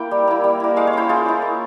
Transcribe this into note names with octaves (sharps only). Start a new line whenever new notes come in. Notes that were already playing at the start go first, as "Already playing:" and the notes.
Already playing: A#3 E4 G5
G3
A#3 E4
G3
A#3 E4
G#3 F5
C#5
C#4 E4 C5
G#3 F4
C#4 E4
A#3